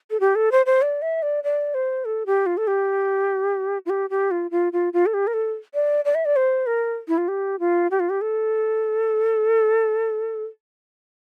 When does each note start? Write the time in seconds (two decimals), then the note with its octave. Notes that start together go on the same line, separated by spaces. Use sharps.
0.10 A4
0.20 G4
0.35 A4
0.52 C5
0.66 C5
0.82 D5
1.02 E5
1.22 D5
1.44 D5
1.74 C5
2.05 A4
2.26 G4
2.46 F4
2.57 A4
2.67 G4
3.86 F4
3.90 G4
4.10 G4
4.31 F4
4.51 F4
4.73 F4
4.93 F4
5.06 A4
5.14 G4
5.27 A#4
5.33 A4
5.74 D5
6.05 D5
6.15 E5
6.25 D5
6.36 C5
6.66 A#4
7.08 E4
7.18 F4
7.28 G4
7.59 F4
7.91 G4
8.00 F4
8.09 G4
8.21 A4